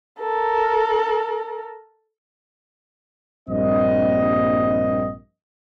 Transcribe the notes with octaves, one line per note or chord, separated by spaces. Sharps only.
A4 A#4
A#1 G2 G3 A#3 C4 D#5